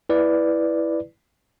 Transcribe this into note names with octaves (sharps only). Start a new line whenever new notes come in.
E4 B4 D5